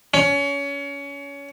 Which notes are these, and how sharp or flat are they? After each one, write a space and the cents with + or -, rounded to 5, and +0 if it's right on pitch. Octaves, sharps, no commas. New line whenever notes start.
C#4 +25